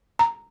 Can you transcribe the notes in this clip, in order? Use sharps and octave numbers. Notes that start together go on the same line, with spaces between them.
A#5